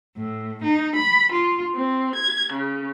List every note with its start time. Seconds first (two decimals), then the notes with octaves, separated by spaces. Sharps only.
0.17 A2
0.63 D#4
0.95 B5
1.31 F4
1.74 C4
2.14 G#6
2.51 C#3